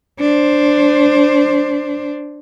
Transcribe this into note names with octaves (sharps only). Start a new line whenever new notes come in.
D4 C5